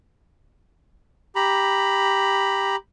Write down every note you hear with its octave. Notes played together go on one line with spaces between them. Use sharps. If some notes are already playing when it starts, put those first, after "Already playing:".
G4 A#5 B5